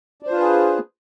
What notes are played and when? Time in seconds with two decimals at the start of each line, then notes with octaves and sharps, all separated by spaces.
0.22 D4
0.27 C5
0.31 F4
0.36 B4
0.40 G#4